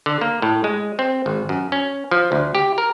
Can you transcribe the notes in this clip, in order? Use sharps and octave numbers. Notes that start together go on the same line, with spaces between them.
D3
A#3
A2
G#3
C4
G#1
F#2
C#4
F3
D2
G4
A#4